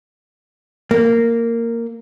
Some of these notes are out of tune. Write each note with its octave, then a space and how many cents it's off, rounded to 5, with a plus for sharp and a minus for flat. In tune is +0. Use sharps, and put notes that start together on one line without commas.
A#3 -10